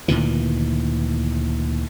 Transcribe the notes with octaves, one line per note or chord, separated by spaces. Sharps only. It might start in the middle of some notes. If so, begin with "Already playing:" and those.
D2 A#2 D#3 E3